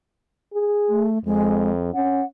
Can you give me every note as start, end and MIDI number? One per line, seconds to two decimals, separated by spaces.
0.53 1.06 68
0.89 1.18 57
1.25 1.94 41
1.25 1.71 56
1.94 2.22 61
1.94 2.25 78